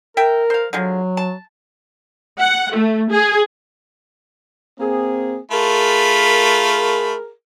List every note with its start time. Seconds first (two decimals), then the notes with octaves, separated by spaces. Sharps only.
0.17 A#4 E5 G5
0.50 C5 F5
0.73 D3 F3 F#3 G#3
1.17 A5
2.39 F#5
2.73 A3
3.10 G#4
4.80 A#3 C4 G#4
5.51 A3 F4 G#4 A#4 B5